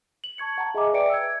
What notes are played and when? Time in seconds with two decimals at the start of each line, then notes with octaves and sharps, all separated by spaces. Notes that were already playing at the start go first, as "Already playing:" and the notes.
0.24 F#7
0.38 A5 C#6 G#6 C#7
0.58 F#5 A5 A#5
0.74 G#4 D#5 E5 G#5 A#5 D6
0.93 B4 D5 E5 G5 C#7 D7
1.10 E6 G#6